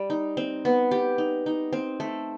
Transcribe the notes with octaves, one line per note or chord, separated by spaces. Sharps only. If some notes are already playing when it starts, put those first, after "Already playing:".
Already playing: G3
D#4
C4
B3
G4
D#4
D#4
C4
A3